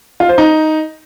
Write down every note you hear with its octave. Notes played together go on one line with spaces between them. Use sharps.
F4
C5
D#4